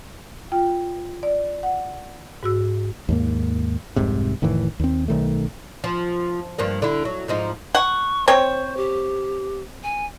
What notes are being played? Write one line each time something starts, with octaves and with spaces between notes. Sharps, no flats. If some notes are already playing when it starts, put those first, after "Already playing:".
F4 G5
D5
F#5
G#2 F#4 E6
D#2 G#2 A#3
F1 C2 G#2 C3
F1 A2 D#3 E3
D#2 C4
B1 D#3 A3
F3
G2 F3 A#3
D3 E4
F#3
G#2 F3 D#4
F#5 C#6
C4 C5 C#5
G4
G#5